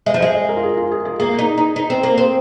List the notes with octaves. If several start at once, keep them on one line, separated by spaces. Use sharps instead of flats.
G#3 D#5
F3
G#3 D#5
D#5
A#4
F4
G#4
F4
G#4
G#4
A#3 G#4
D#4
D#4
D#4
C4
A#3
C4